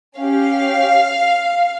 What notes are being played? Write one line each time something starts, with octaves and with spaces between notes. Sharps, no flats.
C#4 F5
G4